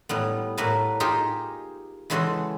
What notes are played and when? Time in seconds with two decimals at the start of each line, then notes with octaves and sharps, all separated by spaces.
0.09 A2 G3 B3
0.57 A2 A#3 F#4 B4 A5
1.00 D#4 F4 G4 G#4 C5
2.10 C#3 E3 G#3 F#4 A4 C5